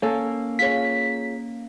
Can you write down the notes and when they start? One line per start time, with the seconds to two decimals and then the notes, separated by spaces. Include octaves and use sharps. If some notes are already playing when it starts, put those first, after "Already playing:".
0.02 A#3 C#4 A4
0.59 F4 G#4 C#5 B6